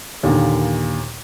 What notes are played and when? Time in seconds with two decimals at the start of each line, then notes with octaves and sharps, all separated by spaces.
0.23 D#2 A#2 D3